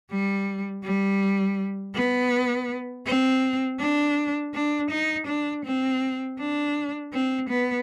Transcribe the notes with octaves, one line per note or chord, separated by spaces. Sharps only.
G3
G3
B3
C4
D4
D4
D#4
D4
C4
D4
C4
B3